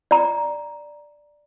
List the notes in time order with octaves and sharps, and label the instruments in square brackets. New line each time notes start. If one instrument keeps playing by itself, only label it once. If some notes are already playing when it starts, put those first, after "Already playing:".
[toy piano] D5 A#5